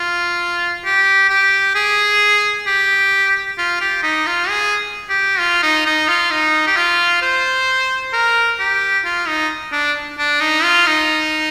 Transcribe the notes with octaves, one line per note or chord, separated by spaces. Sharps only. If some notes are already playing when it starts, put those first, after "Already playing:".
Already playing: F4
G4
G4
G#4
G4
F4
G4
D#4
F4
G#4
G4
F4
D#4
D#4
F4
D#4
G4
F4
C5
A#4
G4
F4
D#4
D4
D4
D#4
F4
D#4